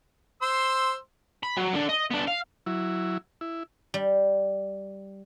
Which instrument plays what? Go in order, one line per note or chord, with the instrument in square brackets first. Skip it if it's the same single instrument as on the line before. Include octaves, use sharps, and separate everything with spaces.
[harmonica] C5 C6 E6
[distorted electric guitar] B5
F#3
D3 D4
D#5
B3 D4
F5
[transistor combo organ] F#3 E4
E4
[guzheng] G3